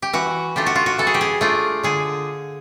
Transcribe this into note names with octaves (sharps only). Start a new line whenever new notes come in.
G4
E3 F#4
A3 D4 F4 G4
F#4
F4
F#4
E3 A4
G#4
G4
G#4
A3 D4 F4
D3 G#4